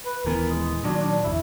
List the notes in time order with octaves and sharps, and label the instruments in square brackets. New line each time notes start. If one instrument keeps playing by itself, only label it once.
[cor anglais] B4
[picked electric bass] D#1 E3 B3 [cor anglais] A#4
[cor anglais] G#3
[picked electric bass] A#2 D#3 F#3 [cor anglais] D4
[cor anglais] D4
[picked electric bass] G1 E2 [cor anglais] E4